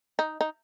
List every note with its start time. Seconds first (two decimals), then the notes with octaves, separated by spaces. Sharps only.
0.19 D#4
0.41 D#4